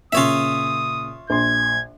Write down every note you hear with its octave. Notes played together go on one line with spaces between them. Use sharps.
A#2 C#3 F4 C#5 E5 D#6
A#1 C6 G#6